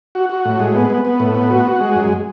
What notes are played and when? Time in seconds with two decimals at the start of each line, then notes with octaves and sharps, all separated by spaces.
0.15 F#4
0.30 F#4
0.45 A2
0.60 G#3
0.75 B3
0.90 B3
1.05 B3
1.20 A2
1.35 B3
1.50 F#4
1.65 F#4
1.80 G#3
1.95 F#2